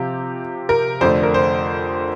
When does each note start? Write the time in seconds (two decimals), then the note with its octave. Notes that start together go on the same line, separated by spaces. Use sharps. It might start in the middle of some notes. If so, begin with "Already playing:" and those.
Already playing: C3 F3 C4 F4 G4
0.69 A#4
1.01 F2 D3 A3 D4 C5
1.23 A#4
1.34 C5